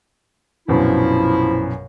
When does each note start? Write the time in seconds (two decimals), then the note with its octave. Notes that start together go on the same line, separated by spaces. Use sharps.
0.68 A#1 F#2 B2 F3 E4